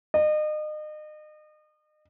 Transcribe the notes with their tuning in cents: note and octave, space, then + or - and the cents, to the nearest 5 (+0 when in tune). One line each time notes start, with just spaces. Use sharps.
D#5 -35